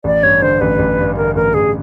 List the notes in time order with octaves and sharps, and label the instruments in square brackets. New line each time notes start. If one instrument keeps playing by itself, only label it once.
[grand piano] A1 [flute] D5
[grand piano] G2 [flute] C#5
[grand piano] D3 [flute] C5
[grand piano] A1 [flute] B4
[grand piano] A1
G2
[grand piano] D3 [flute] A#4
[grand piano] A1 [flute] A#4
[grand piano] A1 [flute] G#4